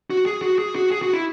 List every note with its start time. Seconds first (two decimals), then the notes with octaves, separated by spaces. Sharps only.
0.10 F#4
0.26 G#4
0.42 F#4
0.59 G#4
0.75 F#4
0.91 G#4
1.02 F#4
1.13 E4